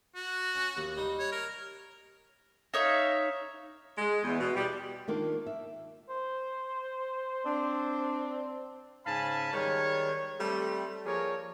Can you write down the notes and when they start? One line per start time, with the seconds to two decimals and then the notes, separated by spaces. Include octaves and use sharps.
0.15 F#4
0.55 C#4
0.77 D#2
0.97 G3 D#4
1.19 C#5
1.32 A#4
2.74 D#4 C#5 E5 F5
3.98 G#3
4.23 E2
4.39 B2
4.54 G3
5.08 D#3 A#3 D4 F4
5.46 E5
6.09 C5
7.45 C4 D4
9.06 G#2 C#3 F5 G#5 A5 B5
9.53 D#3 G3 G#3 C#5
10.40 G3 A3 C4
11.06 F3 A#3 G#4 A#4 C#5 D5